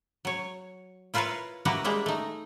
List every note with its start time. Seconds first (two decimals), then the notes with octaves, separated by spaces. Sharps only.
0.25 F#3 C#5
1.14 E4 F4 A#4 B4 C#5 F5
1.65 A#3 E4 F#4 G4 A#4 B4
1.84 G3 G#3 A#3 E5
2.06 A3 D#4